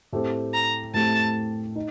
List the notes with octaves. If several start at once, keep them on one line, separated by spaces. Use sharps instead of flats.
A2 A3 C4 G4
A#5
A2 A3 C4 G4 A5
D#4